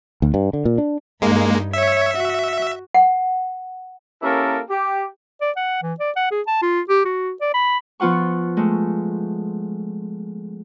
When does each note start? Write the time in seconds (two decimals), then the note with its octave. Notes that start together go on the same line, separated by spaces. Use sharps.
0.22 D2
0.34 G2
0.53 D3
0.65 A#2
0.78 D4
1.22 G2 G#3 A#3 D#4
1.73 C#5 E5
2.17 F#4
2.94 F#5
4.22 A#3 C#4 E4 G4 A4 A#4
4.69 G4
5.41 D5
5.57 F#5
5.83 E3
6.00 D5
6.16 F#5
6.31 G#4
6.47 A5
6.62 F4
6.89 G4
7.05 F#4
7.41 D5
7.54 B5
8.00 F3 B3 F4 F#5 C#6
8.57 G#3 A3